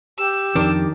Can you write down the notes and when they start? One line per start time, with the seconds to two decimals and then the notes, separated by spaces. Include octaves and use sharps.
0.18 G4 E6
0.56 F2 D#3 F3 D4